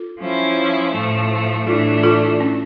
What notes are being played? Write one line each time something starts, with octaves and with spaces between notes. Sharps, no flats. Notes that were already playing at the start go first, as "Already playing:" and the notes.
Already playing: F4 A4
F3 C#4 E4
A2 F3 A3
A2 E3 A3 D4 F4 A4
F4 A4
C#4